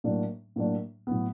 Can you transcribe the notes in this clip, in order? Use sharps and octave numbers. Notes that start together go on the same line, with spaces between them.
A2 F#3 A#3 D4
A2 F#3 A#3 D4
A2 F#3 B3